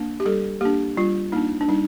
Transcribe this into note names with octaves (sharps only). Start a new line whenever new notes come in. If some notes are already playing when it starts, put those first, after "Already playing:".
Already playing: A#3 D4
G4
G3 A4
A#3 D4 G4
G3 F4
A#3 D4 D#4
D4
G3 D#4